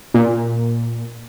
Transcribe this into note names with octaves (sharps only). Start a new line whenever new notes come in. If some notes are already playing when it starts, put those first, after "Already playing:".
A#2